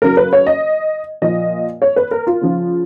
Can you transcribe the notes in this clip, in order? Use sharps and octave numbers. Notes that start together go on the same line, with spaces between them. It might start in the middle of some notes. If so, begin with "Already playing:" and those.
C#3 F#3 A#4
B4
C#5
D#5
A#2 F3 D#5
C#5
B4
A#4
F4
C#3 F3